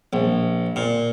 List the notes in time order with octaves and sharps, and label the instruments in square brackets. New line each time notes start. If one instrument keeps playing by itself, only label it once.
[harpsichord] A#1
A#2